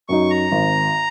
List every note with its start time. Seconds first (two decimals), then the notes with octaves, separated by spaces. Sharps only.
0.08 F#2 F#3 D#4 C#6
0.30 A#5
0.52 G#1